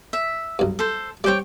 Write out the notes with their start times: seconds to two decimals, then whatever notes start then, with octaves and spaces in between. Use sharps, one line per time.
0.13 E5
0.59 B1 G2
0.79 A4 C5
1.24 G3 C4 C#5 G5 D6